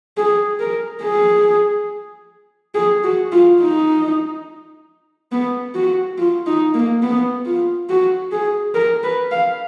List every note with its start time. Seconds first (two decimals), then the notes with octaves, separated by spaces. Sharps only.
0.17 G#4
0.60 A#4
1.03 G#4
2.75 G#4
3.04 F#4
3.32 F4
3.60 D#4
5.32 B3
5.75 F#4
6.18 F4
6.47 D#4
6.74 A#3
7.03 B3
7.46 F4
7.89 F#4
8.32 G#4
8.75 A#4
9.04 B4
9.32 F5